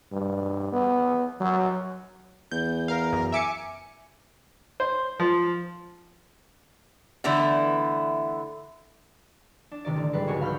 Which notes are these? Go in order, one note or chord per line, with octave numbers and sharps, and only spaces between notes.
G2
B3
F#3
E2 G6
A#4 F5
F#2
E5 G#5 D6 C#7
C5
F3
D3 E3 A3 B3 E4
D4
A1 C3 D#3 D5
D3
G#2 G3 B4 C7
F1 C#2 C#3 F#4 C#5
F5 B5 F6 G6